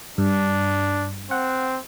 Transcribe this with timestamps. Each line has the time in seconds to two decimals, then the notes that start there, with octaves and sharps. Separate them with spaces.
0.18 G2 D4
1.31 C4 F#5